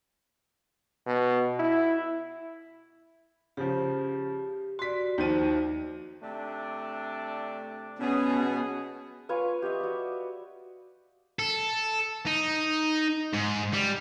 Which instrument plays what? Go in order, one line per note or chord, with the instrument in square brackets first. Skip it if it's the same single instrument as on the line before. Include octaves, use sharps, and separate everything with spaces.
[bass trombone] B2
E4
[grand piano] C#3 F3 [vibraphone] G4
[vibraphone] F#4 D5 [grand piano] C6 B6
[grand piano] D#2 F3 D#7 [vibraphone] D#4 F#4
[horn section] C3 A3 D4
[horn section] B2 G#4 [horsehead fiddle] B3 [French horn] C#4
[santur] F4 B4 C#5 G#5
G4 C#5 D#5 E5
F#4 D5
[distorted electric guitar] A4
D#4
G#2
G3